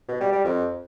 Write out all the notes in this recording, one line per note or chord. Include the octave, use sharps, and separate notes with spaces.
B2
G3
G3
F2